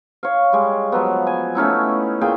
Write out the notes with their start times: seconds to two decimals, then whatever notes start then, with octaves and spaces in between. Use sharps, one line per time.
0.23 C#5 F5
0.53 G3 G#3
0.92 F3 F#3 B3
1.27 G#5
1.55 A3 C#4 D#4 E4
2.21 A#2 G#4 G5